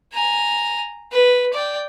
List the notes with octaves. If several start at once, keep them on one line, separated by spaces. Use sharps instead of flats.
G#5 A#5
B4
D5 G5